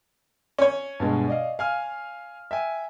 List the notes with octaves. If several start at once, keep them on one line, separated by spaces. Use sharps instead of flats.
C#4 C#5
G2 B2 G#3
D5 D#5 F5
F5 G#5 F6
E5 G5 G#5